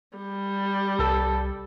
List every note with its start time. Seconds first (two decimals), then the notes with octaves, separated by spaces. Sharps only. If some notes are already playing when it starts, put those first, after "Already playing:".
0.17 G3
0.99 C2 A4